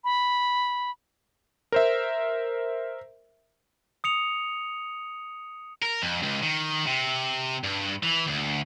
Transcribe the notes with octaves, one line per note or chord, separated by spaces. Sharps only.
B5
A#4 C5 E5
D#6 C#7 F7
A#4
F2
C#2
D#3
C3
G2
E3
D2